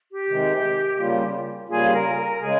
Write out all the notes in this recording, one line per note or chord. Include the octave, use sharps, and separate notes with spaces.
G4
C3 D#3 G#3
C#3 G3 A#3 F4
C#3 G3 A#3 F4 G#4
A#4
A#4
C#3 G#3 G#4